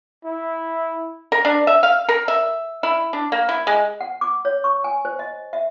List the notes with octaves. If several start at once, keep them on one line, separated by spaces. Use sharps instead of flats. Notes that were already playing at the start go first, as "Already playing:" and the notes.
E4
A#4
D4
E5
F5
A#4
E5
E4
D4
A#3
E4
G#3
F#5
D6
C#5
C#6
G#5
C5
D#5
E5